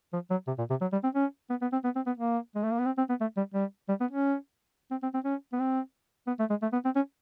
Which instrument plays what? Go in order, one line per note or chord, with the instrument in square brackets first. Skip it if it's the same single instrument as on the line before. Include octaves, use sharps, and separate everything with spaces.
[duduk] F3
F#3
C3
A#2
C3
F#3
G3
C4
C#4
B3
B3
C4
B3
C4
B3
A#3
G#3
A3
A#3
B3
C4
C4
B3
A3
G3
G3
G3
B3
C#4
C4
C4
C4
C#4
B3
C4
B3
A3
G#3
A3
B3
C4
C#4